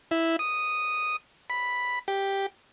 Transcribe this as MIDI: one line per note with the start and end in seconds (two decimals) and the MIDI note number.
0.11 0.36 64
0.39 1.16 87
1.50 1.99 83
2.08 2.46 67